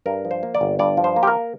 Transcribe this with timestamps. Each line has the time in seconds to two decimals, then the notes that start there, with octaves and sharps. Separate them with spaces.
0.06 G2 A#4
0.25 F3
0.31 C5
0.43 A#3
0.55 D5
0.61 G1
0.79 G2 D5
0.97 F3
1.04 C5
1.16 A#3
1.23 G4
1.27 A#4